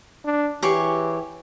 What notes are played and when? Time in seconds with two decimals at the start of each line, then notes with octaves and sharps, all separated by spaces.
0.25 D4
0.63 E3 G4 G#4 C#5